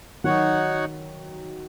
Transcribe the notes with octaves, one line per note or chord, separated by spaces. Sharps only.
D#3 F#3 D#4 F#4 C#5 F#5